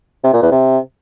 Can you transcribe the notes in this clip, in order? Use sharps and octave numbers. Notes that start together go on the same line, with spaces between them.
C3
A#2
E2
C3